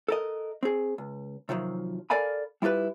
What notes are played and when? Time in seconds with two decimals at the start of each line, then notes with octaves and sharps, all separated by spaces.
0.08 A4 A#4 D#5
0.63 C4 G#4
0.98 C#2
1.49 C3 D#3 F3 F#3
2.10 A4 A#4 D5 F5 G#5 B5
2.62 G3 E4 F4 G4 B4